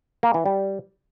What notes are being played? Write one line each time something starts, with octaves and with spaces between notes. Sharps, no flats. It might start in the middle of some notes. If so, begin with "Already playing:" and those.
A#3
E3
G3